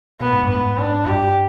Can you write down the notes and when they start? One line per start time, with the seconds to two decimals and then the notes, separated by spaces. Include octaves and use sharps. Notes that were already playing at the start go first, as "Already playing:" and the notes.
0.20 B2 B3
0.33 G#2
0.43 G2
0.50 B3
0.55 G#2
0.78 G#2 D4
1.06 G2 G4